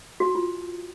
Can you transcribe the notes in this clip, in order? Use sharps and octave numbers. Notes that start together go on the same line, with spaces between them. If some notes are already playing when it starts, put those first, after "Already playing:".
F#4
F4